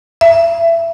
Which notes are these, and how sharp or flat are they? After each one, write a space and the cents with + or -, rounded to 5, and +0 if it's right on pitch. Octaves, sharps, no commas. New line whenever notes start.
E5 +20